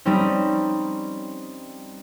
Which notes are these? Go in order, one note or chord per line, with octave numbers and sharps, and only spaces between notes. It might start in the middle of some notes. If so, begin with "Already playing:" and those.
G3 C4 C#4 D#4